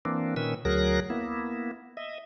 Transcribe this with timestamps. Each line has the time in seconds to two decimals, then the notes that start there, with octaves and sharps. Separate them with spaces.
0.05 E3 A#3 C4 D4
0.36 A#2 D#3 C#4 B4 E6
0.65 D2 F#3 G#4 A#4 F#6 A#6
1.10 A#3 B3 E4
1.97 D#5 E5